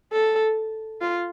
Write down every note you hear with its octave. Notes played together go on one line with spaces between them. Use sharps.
A4
F4